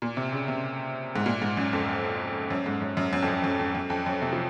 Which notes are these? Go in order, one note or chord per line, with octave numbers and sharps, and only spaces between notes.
A#2
C3
C#3
C3
G#2
A#2
G#2
F#2
F2
F#2
G#2
F#2
F#2
F#2
F2
F#2
F#2
F2
F#2
F2
F#2
C3
F3